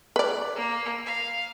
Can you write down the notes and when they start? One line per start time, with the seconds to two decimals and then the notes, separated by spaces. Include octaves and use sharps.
0.16 B4 D5
0.56 A#3
1.06 F5